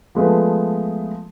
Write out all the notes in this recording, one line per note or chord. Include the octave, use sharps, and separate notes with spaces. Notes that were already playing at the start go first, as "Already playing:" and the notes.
F3 G#3 A3 B3